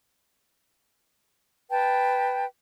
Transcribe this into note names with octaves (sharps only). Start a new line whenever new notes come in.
B4 G5 A5